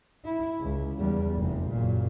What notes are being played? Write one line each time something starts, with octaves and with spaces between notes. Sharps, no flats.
E4
C#2
E2 G3
F1 C3
F#1 A#2